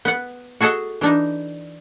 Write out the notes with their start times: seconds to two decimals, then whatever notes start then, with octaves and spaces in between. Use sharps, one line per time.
0.05 B3 F#5
0.60 F#4 G#4 A4 D#5 F#5
1.01 E3 D4 D#4